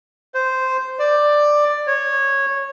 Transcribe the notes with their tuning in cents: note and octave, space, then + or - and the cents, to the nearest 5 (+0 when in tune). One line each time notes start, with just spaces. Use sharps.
C5 -10
D5 +10
C#5 -15